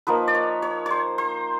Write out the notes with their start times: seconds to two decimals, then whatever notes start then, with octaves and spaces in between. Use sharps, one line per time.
0.07 F3 A#3 D#4 B4
0.28 D5
0.35 C#5
0.62 C#5
0.86 C5 C#5
1.18 C5